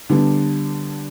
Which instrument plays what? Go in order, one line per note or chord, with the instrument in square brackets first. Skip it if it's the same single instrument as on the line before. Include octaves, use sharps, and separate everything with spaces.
[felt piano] D3 G3 B3 D4